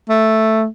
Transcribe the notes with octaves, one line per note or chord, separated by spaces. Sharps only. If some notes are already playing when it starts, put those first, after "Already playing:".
A3